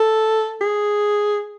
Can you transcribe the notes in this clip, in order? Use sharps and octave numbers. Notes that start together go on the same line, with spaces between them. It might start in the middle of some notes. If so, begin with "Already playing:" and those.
Already playing: A4
G#4